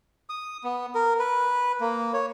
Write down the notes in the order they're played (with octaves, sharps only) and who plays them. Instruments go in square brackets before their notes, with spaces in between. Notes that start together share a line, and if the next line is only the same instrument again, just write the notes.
[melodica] D#6
B3
A#4
B4
A#3
C#5